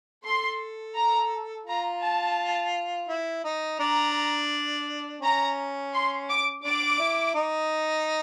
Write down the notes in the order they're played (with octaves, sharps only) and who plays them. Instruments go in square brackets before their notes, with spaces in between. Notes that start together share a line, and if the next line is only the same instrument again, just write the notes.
[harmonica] A4 [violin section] C6
[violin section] A#5
[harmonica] F4 [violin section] A#5
[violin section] A5
[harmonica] E4
D#4
[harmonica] D4 [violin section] A#5
[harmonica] C#4 [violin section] A#5
[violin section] C6
D6
[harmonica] D4 [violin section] D6
[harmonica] E4
D#4